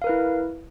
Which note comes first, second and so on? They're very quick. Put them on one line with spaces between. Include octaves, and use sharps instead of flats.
F5 A#4 B4 E4